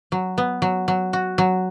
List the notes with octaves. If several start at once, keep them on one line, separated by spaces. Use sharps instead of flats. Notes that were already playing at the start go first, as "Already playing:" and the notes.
F#3
B3
F#3
F#3
F#4
F#3